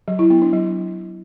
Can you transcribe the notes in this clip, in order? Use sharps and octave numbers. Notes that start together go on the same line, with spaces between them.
F#3
E4
B3
D4
F#3